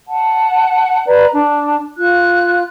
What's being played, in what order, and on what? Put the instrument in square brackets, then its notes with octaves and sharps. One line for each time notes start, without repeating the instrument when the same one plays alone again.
[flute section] F#5 A5
B4 D5 A#5
D4
F4 F#6